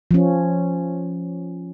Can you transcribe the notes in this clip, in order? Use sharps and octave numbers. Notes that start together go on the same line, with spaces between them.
F3 C#4